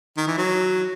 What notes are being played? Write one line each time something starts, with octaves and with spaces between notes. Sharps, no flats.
D#3
E3
F#3